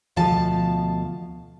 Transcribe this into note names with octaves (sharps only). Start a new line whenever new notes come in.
D2 B2 F3 F5 A5